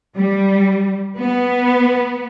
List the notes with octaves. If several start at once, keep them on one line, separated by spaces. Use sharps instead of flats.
G3
B3